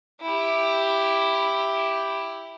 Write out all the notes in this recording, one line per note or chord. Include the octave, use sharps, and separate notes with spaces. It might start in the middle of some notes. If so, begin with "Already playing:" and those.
E4 G4